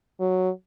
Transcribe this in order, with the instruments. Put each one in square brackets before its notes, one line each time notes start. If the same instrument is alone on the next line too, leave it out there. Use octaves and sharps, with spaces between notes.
[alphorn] F#3